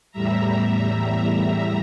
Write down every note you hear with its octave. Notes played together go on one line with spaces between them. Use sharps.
E2 A2 G3 E5 A#5